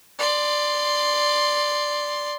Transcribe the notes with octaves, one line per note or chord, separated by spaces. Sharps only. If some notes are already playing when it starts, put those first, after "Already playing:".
D5 C6